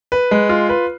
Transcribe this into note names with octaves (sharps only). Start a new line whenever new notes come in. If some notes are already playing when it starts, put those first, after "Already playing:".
B4
G#3
F4
B4